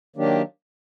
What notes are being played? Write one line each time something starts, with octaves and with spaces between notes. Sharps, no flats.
D#3 F#3 A#3 D4 G4